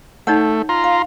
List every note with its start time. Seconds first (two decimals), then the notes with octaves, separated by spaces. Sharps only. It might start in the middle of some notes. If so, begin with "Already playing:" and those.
0.27 A3 D#4 C#5 F#5
0.69 F4 A#5 C6
0.84 F5